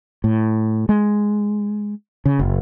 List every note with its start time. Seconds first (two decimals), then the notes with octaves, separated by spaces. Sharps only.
0.24 A2
0.89 G#3
2.25 C#3
2.39 F#1